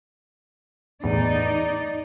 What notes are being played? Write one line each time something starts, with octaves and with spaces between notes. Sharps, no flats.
E2 A2 D#4 D5